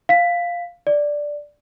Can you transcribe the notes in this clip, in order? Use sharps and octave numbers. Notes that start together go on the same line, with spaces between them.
F5 B6
D5